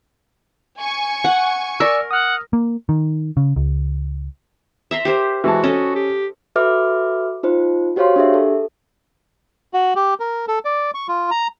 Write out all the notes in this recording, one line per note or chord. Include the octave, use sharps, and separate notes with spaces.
G#5 C#6
F#5
A#4 D5 E6
F#5 D#6 F6
A#3
D#3
C#3
C#2
E5 A#5 C6
G4 A#4 C5
E3 G#3 F#4 A5
C#4 A4 D#5
G4
F#4 A4 B4 E5 D6 F6
D#4 F4 C5
F#4 G4 C5 C#5 F5 C6
D4 G4 G#4 E5
A4
F#4
G4
A#4
A4
D5
C#6
F4
A#5